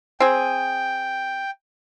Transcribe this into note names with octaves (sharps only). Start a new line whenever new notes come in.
C4 G#4 G5